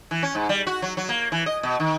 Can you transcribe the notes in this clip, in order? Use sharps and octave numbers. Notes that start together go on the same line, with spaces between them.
E3
C#4
G#2
G3
F#4
F#3
F#3
A#3
E3
D#5
B2
D#3